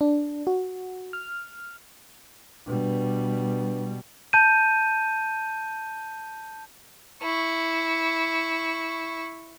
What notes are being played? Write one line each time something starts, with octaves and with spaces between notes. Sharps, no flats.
D4
F#4
F6
B2 G3 D4 B4
A5 G6 D#7
E4 C#6